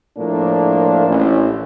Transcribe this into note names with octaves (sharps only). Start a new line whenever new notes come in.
A2 F3 A#3 D4
A1